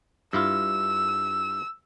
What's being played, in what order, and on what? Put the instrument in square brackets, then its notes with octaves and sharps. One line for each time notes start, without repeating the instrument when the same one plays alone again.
[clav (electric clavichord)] G2 E4 F4 [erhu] E6